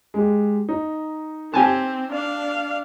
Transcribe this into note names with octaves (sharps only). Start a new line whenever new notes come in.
G#3 G4
D#4
C4 G4 G#5 A5
D4 D5 F5